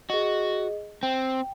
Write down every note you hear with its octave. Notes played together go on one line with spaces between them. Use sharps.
F#4 G#4 D#5
C4 G5